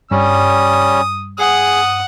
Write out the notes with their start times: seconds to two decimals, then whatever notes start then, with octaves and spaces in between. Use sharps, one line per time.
0.11 G2 G3 C#4 D#6
1.39 G#4 F#5 D#6